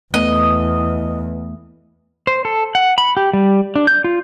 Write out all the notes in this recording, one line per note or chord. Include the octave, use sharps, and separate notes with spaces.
E2 A3 B3 D#5
C5
A4
F#5
B5
G4
G3
D4
G6
F4